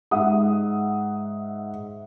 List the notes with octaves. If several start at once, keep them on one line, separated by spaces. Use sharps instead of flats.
G#2 E5 F#5 D#6